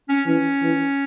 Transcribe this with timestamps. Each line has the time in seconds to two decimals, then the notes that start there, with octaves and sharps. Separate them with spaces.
0.09 C#4
0.26 E3 C#4
0.62 E3